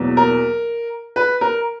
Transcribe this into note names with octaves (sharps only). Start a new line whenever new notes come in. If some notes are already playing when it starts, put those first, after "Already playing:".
Already playing: E2 B2 F#3 A#3
A#4
B4
A#4